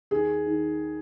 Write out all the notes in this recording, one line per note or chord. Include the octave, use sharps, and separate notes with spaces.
D#2 G#4
D#3